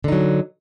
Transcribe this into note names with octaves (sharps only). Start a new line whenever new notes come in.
D3 F#3 D#4